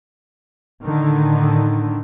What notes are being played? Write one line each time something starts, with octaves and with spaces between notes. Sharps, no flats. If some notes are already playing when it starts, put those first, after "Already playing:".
A2 D3 D#3